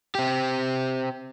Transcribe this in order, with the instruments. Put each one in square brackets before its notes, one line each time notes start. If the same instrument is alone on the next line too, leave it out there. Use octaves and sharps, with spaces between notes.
[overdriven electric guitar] C4 G4